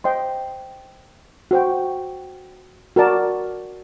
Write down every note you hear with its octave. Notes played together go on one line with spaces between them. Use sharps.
C5 D#5 G5 C6
F#4 C5 G5
F#4 A#4 D5 A5